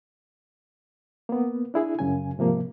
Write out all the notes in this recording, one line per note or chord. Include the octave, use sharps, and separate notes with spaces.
A#3 B3
D4 E4 G#4
F#2 C#3 G#5
G#2 C3 F3 A#3